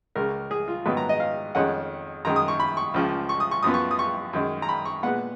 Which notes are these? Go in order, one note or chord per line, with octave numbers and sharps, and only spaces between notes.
C#2 C#3 G#3 A#4
G#4
F4
G#2 D#3 F#3 B3 B4
A#5
D#5
F5
F2 D#3 G#3 C#4 F#5
F#2 D#3 G#3 A#5
D#6
C#6
B5
C#6
C#2 C#3 F3
C#6
D#6
C#6
F#2 F3 B3 D#6
C#6
D#6
C#6
F#2 D#3 G#3
A#5
B5
C#6
A#2 G#3 B3 F#5